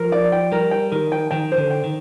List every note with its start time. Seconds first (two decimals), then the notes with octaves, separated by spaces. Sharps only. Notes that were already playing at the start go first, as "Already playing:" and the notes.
Already playing: F3 A#4
0.12 D5
0.32 G5
0.52 G3 A#4
0.71 G5
0.92 D#3 A#4
1.12 G5
1.31 D#3 G5
1.52 C5
1.57 D3
1.70 G5
1.84 D#3